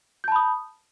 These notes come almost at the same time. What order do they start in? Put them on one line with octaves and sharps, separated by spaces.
G6 A5 B5 D#6